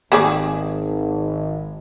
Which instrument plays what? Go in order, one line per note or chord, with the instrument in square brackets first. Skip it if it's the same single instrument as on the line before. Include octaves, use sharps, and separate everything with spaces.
[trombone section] G#1 [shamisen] A#3 G#4 D5